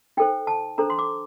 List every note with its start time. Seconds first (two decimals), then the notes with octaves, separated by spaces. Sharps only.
0.17 D#4 A4 C5 G5
0.47 A5
0.78 D4 A4 C5 A#5
0.90 C6
0.98 D6